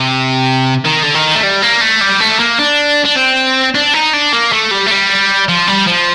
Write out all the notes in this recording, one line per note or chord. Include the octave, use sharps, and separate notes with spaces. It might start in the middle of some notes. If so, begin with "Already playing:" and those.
Already playing: C3
D#3
D3
D#3
A3
G3
A#3
A3
G3
A3
A#3
D4
D4
C4
D4
D#4
D4
A#3
A3
G3
A3
G3
F3
G3
F3